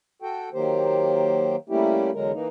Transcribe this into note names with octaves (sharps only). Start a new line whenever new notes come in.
F#4 A4 G5
D#3 F#3 A#3 G4 C5
G3 A3 A#3 C#4 E4 G4
E2 D3 F#3 G#3 A#4
E3 A#3 D#4